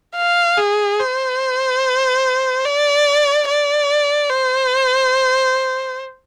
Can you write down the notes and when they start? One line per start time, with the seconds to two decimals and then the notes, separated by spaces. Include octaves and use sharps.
0.16 F5
0.57 G#4
1.00 C5
2.65 D5
3.48 D5
4.30 C5